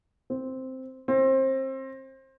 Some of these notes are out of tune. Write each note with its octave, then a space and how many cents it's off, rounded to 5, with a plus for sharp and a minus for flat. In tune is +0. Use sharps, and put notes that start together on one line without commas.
C4 -5
C4 +25